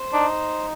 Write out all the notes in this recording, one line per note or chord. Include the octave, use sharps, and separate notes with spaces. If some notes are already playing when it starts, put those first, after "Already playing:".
Already playing: C5
D4 D#4